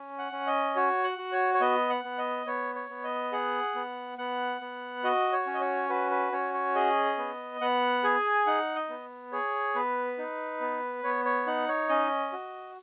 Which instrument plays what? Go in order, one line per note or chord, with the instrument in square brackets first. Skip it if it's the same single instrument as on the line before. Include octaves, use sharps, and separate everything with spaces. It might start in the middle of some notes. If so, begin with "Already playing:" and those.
Already playing: [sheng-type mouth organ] C#4
F#5
C#4
D#5
F#4 C#5
F#5
F#4
C#5
C#5
B3 D#5
F#5
B3
D#5
B3 C#5
C#5
B3
D#5
G#4 F#5
B3
B3 F#5
B3
F#4 D#5
C#5
C#4
D#5
C#5
F#4 B4
B4
C#4 C#5
C#5
G#4 D#5
B3
B3 F#5
G#4 G#5
D#4 F#5
D#5
B3
G#4 C#5
B3 B4
D#4
B3
B3 C#5
C#5
D#4 F#5
C#5
C#4 D#5
F#4